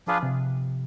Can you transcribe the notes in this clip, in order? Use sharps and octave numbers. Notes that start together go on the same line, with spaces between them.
F3 D4 F4 G#4 B4
C3